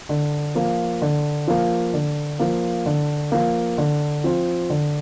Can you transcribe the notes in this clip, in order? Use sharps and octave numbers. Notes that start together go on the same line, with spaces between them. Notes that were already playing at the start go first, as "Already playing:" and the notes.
D3
F3 A#3
D3
F3 A#3
D3
F3 A#3
D3
F3 A#3
D3
F3 C4 F4
D3